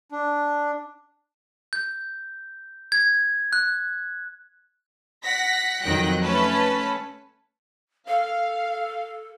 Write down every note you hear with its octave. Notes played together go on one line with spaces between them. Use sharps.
D4
G6
G#6
F#6
F#5 A#6 B6
F2 D#3 F#3 G5 F#6 A#6
A3 C#4 B4 A5
A4 F5